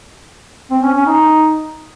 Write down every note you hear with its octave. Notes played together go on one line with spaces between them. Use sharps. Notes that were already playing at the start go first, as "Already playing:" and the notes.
C4
C#4
C#4
D#4